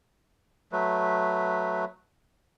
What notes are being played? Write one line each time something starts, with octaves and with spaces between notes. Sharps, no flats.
F#3 A3 B4